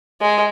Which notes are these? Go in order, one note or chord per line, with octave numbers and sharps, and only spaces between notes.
G#3